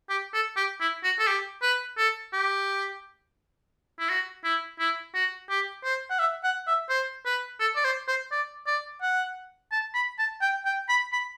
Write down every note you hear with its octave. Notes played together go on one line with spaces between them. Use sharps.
G4
A4
G4
E4
F#4
A4
G4
B4
A4
G4
E4
F#4
E4
E4
F#4
G4
C5
F#5
E5
F#5
E5
C5
B4
A4
D5
C5
C5
D5
D5
F#5
A5
B5
A5
G5
G5
B5
B5